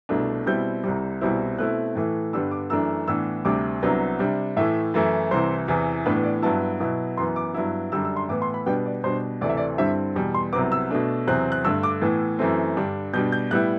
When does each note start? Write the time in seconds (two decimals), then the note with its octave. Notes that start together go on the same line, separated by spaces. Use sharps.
0.09 C2 B2 A3 D4
0.46 B2 G3 C4 E4 G6
0.84 C2 C3 G3
1.21 C2 B2 G3 C4 E4
1.58 B2 A3 C4 E4 F#6
1.96 A2 E3 A3
2.33 G2 D3 G3 B3 D4 E6
2.51 D6
2.70 F#2 E3 A3 D4 E6
3.07 A2 E3 B3 D4 E6
3.45 D2 C3 G3 D4 D6
3.82 C2 C3 F#3 B3 D4
4.19 C3 G3 D4
4.57 A2 E3 A3 E5
4.94 F#2 E3 A3 E4
5.31 C2 C3 E3 C5
5.68 E2 C3 E3
6.06 A2 E3 B3 D4 B4
6.24 D5
6.42 G2 F#3 B3 E4 A5
6.80 B2 F#3 B3 E4
7.17 F#2 E3 B3 C6
7.36 D6
7.54 G2 F#3 B3 E4
7.92 F#2 D3 G3 D4 E6
8.05 E6
8.17 C6
8.29 A2 E3 B3 D6
8.42 C6
8.54 B5
8.66 B2 G3 B3 D4 G5
8.85 D5
9.04 B2 G3 D4 C5
9.41 D2 C3 E3 A3 D5
9.49 E5
9.57 D5
9.78 G2 D3 G3 C4 E4 E5
10.15 E2 B2 G3
10.34 C6
10.53 C2 C3 F#3 B3 D6
10.72 E6
10.91 B2 A3 D4
11.27 E2 C3 F#3 C4 F#6
11.52 F#6
11.64 G2 D3 A3 E6
11.83 D6
12.02 A2 E3 B3
12.39 F#2 E3 A3 C4
12.77 G2 D3 G3 D4
13.14 B2 G3 D4 G6
13.32 G6
13.51 A2 G3 B3 E4 F#6